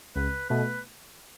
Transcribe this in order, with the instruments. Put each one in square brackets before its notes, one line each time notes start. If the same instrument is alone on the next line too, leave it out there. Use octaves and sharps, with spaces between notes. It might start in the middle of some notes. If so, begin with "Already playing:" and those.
[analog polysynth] C#2 [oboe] B4
[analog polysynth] B2 A3 [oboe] B4